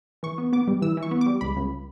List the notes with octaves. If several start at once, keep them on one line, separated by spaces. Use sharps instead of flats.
E3 C#6
B3
B3 D6
G3
E3 E6
E3
C#6
B3
D6
G3
C#2 B5
C#2